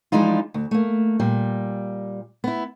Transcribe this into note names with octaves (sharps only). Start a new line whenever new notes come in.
E3 F3 G#3 D4 D#4 F4
D2
A3 A#3
A#2 G3
B3 E4